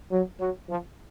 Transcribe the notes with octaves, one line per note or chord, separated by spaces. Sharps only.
F#3
F#3
F3